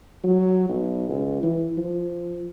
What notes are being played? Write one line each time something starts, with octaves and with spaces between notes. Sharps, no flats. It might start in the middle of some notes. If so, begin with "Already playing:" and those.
F#3
B1
C#2
E3
F3